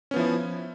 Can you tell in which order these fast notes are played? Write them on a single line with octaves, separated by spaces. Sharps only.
C#4 B3 F3 E4